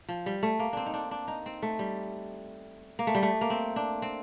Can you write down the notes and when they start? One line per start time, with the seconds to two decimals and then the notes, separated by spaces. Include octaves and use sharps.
0.09 F3
0.26 G3
0.43 A3
0.59 A#3
0.73 C4 D4
0.86 D#4
0.94 D4
1.11 D4
1.28 D#4
1.46 C4
1.62 A3
1.79 G3
2.99 A#3
3.07 A3
3.15 G3
3.23 A3
3.41 A#3
3.50 C4
3.76 D4
4.02 C4